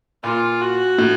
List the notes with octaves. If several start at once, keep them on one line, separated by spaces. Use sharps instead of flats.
A#2 F4
F#4
A2